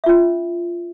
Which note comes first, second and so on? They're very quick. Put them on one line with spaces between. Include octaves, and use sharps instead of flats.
E5 F4 C#4